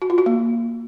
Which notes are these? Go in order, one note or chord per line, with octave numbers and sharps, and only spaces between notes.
F#4
F4
F#4
A#3